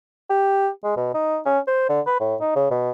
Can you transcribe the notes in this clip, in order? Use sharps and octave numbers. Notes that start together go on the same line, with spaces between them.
G4
G#3
B2
D#4
C#4
C5
D3
B4
A2
D#4
C#3
B2